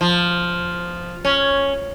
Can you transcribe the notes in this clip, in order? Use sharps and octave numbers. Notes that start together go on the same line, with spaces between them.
F3
C#4